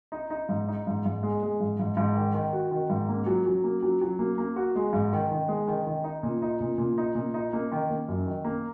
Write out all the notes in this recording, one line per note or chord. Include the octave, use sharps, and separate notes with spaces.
D#4
D#4
G#2
D#4
G#2
G#2
G#3
G#3
G#2
G#2
G#2
D#3
D#3
F#4
D#3
G#2
A#3
F#3
F#3
A#3
F#3
F#3
A#3
A#3
F#4
G#3
G#2
D#3
D#3
G#3
D#3
D#3
D#4
A#2
D#4
A#2
A#2
D#4
A#2
D#4
A#3
D#3
A#3
F#2
D#3
A#3